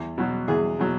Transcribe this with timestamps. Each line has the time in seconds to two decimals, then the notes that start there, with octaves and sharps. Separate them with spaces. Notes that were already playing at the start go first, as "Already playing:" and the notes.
Already playing: E2
0.18 B2 F#3
0.48 E2 G#4
0.79 B2 F#3